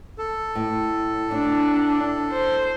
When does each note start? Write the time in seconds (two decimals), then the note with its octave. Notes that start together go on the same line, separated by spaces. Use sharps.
0.18 A4
0.55 A2
1.31 A2 D4
2.32 C5